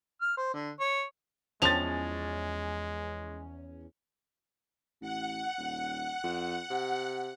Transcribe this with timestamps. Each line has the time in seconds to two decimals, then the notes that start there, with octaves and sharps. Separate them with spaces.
0.21 F6
0.37 C5
0.54 D3
0.79 C#5
1.62 E2 F3 G#3 C#4 A5 A6 F7
5.01 A1 F#5
5.58 D#1
6.24 F2
6.70 C3